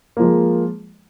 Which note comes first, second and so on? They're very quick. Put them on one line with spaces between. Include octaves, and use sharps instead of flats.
A#3 F3 G#3